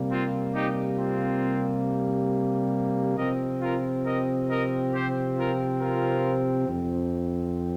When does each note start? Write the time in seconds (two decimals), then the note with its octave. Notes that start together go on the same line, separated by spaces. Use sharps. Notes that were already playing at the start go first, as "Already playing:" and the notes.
Already playing: C3 G3 A#3
0.10 C4 F4
0.53 D#4 G4
0.97 C4 F4
3.17 C3 F3 C4 A#4 D#5
3.61 F4 A#4
4.05 A#4 D#5
4.49 A#4 D#5
4.93 G4 C5
5.38 F4 A#4
5.80 F4 A#4
6.69 F2 F3 C4